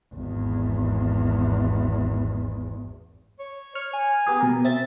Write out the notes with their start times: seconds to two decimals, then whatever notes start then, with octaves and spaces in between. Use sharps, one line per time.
0.14 G#1 E2
3.39 C#5
3.75 C#5 F6
3.93 G#5
4.26 B3 G4 G#4
4.40 B2 A#4
4.65 C4 E5 A6